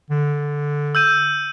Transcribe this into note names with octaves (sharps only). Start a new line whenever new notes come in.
D3
E6 G6 D#7